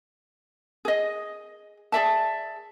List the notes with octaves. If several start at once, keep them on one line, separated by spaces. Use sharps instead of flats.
G#4 D#5
G#4 D5 E5 A5